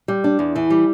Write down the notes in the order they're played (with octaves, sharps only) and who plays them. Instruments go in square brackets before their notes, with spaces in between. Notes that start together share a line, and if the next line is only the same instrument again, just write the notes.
[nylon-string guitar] G3
D4
E2
E3
G3